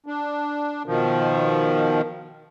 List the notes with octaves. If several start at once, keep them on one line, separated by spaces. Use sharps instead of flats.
D4
B2 D#3 F3